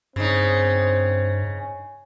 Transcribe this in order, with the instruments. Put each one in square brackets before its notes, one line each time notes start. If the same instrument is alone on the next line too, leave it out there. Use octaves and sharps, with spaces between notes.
[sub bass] G2 [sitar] C#3 D#4 [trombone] C4